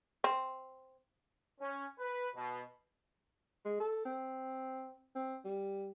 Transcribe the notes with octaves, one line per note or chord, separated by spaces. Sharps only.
C4
C#4
B4
B2
G#3
A4
C4
C4
G3